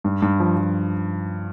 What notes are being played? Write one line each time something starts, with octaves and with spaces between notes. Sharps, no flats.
G2
G2
F3
F3